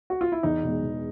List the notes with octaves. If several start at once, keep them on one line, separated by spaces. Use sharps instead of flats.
F#4
F4
E4
E2 D#4
B2 G#3
E2